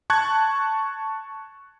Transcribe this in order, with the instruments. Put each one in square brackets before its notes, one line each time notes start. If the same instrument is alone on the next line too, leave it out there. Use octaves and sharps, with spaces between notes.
[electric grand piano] A5 C#6 F#6 G#6